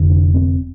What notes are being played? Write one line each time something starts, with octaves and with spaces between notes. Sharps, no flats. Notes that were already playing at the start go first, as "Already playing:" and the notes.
Already playing: F1 F2 D3
D4
C4